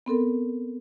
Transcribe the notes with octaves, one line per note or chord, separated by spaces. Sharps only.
B3 C4 A4 A#4